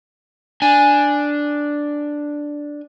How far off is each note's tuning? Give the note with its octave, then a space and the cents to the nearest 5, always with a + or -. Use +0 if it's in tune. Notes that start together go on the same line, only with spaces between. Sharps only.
D4 +0 G#5 +0